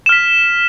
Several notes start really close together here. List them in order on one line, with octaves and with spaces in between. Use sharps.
E7 F6 B6